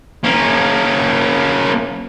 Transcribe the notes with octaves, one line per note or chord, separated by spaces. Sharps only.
A#3 C#4